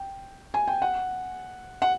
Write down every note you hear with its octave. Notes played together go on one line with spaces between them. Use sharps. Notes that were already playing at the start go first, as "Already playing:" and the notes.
Already playing: G5
G#5
G5
F#5
F#5